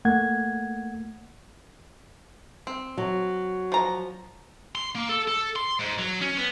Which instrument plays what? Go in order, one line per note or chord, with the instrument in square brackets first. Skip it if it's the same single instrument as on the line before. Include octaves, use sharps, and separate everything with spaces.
[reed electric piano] A3 A#3 F#5 G#6
[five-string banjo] C4
[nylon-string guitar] F#3
[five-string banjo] F3 A#5
[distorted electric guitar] C6
A#3
A4
A4
C6
G#2
F#3
C#4
B3